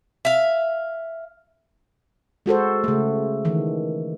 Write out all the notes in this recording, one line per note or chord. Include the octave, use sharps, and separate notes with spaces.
E5 F5
G#3 F#4 A4 C5
C#3 A3
D#3 E3